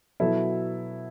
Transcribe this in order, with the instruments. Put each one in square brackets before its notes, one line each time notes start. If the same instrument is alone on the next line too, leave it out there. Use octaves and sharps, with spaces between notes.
[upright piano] B2 F#3 E4 A4